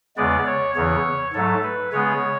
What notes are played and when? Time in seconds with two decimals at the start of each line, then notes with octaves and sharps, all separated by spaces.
0.17 E2 C#3 G#3 B3 D5
0.46 C#5
0.75 E2 C#3 E3 C#5
1.33 G#2 F#3 A3 A4
1.63 B4
1.92 C#3 G#3 B3 C#5